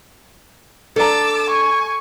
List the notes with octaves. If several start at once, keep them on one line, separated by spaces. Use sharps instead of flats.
D4 A4 A5 A#5 D6 E6
G#5 C#6